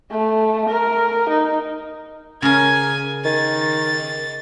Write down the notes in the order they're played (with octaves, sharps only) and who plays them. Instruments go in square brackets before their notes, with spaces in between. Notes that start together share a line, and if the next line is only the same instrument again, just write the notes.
[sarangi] A3
A#4
D#4
[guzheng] C#3 C#4 A#4 [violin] G#5 G#6
[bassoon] D#3 [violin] A6